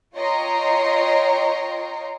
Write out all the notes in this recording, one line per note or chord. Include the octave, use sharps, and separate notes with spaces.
F4 C#5 D#5 G5 A#5 C6